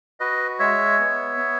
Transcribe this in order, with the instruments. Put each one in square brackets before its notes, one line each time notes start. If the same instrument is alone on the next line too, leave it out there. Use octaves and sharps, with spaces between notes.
[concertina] F#4 B4 D#5
G#3 C#5 E5
B3
B3